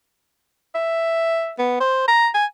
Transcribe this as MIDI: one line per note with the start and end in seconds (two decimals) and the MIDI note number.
0.75 1.53 76
1.59 1.76 59
1.80 2.06 72
2.08 2.29 82
2.34 2.45 80